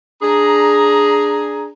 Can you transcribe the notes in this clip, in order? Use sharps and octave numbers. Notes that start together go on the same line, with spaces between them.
D4 G#4 A#5